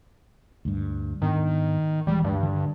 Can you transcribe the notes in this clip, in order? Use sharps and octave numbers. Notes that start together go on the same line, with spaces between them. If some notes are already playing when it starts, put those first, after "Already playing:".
D2 G2
G#2 D#3 B3 D4
D#1 E3 G3 G#3
D2 G2
D3